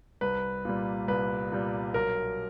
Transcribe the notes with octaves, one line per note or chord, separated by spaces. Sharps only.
C2 B4
A#2 G3
C2 B4
A#2 G3
B1 A#4